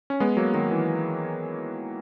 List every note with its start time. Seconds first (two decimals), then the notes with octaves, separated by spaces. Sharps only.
0.10 C#4
0.20 G#3 B3
0.37 F#3 A#3
0.54 D#3 F#3
0.71 E3